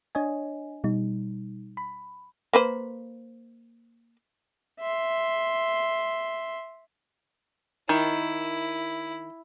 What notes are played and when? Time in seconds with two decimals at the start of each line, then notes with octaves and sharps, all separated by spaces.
0.15 D4 C#5 D#5 G#5
0.84 B2 G3 D#4
1.77 B5
2.53 A#3 B4 C5
4.80 E5 C6
7.89 D#3 E4